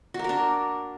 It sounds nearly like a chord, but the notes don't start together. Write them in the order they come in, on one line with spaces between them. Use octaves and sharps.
F#4 A#3 A#4 D4